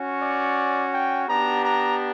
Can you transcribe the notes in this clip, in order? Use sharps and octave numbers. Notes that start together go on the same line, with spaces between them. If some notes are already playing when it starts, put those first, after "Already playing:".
Already playing: C#4 F#4
D5
G5
B3 D4 G4 A#5
A#5